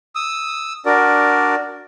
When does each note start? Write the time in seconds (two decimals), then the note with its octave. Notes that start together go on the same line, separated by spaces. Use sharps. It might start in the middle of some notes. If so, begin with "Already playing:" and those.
0.15 D#6 E6
0.86 D4 F#4 A#4 D5